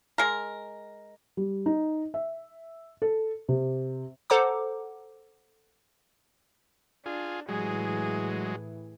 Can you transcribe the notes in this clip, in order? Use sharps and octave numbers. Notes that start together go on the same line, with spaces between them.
G#3 A#4
G3
D#4
E5
A4
C3
A4 C5 F#5 A#5 D6
D4 F4 G#4
A2 E3 F#3 G#3 G#4